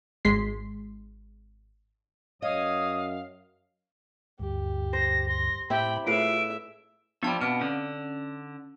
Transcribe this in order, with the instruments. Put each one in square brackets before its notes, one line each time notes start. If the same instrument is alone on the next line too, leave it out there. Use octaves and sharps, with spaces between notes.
[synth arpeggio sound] G#1 G#3 C6 B6 C7
[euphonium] F#2 [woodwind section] C#5 D#6 [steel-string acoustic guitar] D#5 [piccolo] F5
[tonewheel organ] D2 G2 [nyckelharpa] G4
[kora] C5 [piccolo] A#6
[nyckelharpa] C6 [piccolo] A#6
[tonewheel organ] A2 [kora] C4 E4 G4 [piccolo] G5 [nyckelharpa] B5
[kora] A2 B4 F5 [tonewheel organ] F4 [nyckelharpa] G#4 E5 [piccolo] D7
[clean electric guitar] F3 G3 [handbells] B3 D4 A5
[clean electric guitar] B2 [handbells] C4 F6
[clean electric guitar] D3 [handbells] C#4